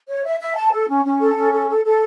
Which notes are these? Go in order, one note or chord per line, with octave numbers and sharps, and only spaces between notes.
C#5
E5
E5
A5
A4
C#4
C#4
A4
C#4
A4
A4
A4